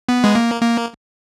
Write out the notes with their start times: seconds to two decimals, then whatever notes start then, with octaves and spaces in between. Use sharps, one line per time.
0.09 B3
0.24 G#3
0.35 A#3
0.61 A#3